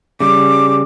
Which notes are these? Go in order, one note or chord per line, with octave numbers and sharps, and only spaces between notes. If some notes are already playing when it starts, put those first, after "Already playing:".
C#3 G3 D6